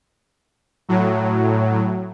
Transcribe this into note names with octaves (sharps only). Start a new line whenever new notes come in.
A2 F#3